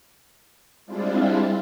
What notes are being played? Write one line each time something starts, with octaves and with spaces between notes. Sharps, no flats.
G3 G#3 C4 D4 E4 F4